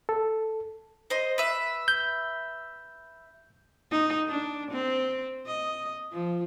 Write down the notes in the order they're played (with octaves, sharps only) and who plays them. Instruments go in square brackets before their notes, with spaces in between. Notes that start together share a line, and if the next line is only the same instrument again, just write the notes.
[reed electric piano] A4
[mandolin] C5 D#5
B4 E5
[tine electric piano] G6
[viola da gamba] D#4
D4
C4
D#5
F3